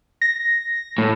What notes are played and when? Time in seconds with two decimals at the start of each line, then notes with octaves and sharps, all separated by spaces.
0.21 A#6
0.98 A2